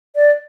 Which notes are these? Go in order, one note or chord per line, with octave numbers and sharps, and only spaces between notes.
D5